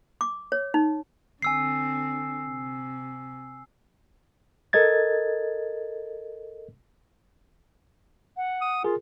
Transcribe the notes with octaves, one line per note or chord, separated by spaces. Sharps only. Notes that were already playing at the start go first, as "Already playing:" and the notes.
D6
C#5
D#4
D3 C4 G#5 E6 C7
C3
A4 A#4 D#5 G#6 A6
F#5
D#6
F4 G#4 A#4